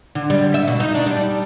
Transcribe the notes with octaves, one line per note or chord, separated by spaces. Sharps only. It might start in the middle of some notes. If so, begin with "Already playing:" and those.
D3
G3
E5
B2
D#4
D4
G3